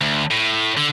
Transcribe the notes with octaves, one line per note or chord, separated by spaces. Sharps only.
D2
A2
D3